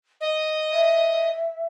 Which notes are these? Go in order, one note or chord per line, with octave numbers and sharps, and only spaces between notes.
D#5
E5